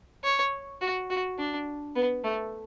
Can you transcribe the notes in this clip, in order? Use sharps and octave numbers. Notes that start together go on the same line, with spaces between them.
C#5
F#4
F#4
D4
B3
A3